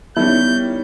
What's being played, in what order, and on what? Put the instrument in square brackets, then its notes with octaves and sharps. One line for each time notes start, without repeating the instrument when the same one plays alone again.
[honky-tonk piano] D#3 G3 C#4 [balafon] B3 [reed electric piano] E4 [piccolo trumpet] G6